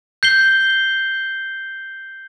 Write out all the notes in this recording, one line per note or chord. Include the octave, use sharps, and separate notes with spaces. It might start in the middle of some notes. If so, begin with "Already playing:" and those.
G6 C7 G7